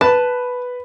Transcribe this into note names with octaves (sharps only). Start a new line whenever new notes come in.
B4 A5